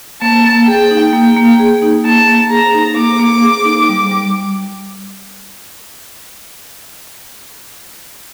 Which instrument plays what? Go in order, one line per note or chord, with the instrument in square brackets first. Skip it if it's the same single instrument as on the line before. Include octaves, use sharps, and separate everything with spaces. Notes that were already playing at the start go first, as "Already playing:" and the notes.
[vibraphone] A#3 [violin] A5
[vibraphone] A#3
[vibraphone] G#4 [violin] G5
[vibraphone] D#4
[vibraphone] A#3 [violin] G5
[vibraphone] A#3
G#4
D#4
[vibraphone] A#3 [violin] A5
[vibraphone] A#3
[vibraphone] G#4 [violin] A#5
[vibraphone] D#4
[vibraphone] A#3 [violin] D6
[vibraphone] A#3
G#4
D#4
G3
G3